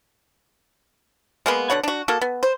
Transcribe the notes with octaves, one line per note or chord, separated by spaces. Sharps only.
G#3 A#3 B3
B2 D3 C#5 F#5
D4 F#4
A#3 F#4 A4
B3
C5